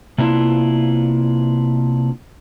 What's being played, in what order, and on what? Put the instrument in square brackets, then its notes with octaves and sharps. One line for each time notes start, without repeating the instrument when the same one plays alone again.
[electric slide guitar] C3 A#3 B3 D4 E4 F4